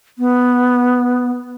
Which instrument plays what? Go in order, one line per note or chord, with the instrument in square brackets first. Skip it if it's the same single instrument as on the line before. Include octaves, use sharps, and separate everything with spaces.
[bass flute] B3